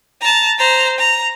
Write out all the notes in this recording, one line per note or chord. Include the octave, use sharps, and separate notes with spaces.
A5 A#5
C5 A#5
A#5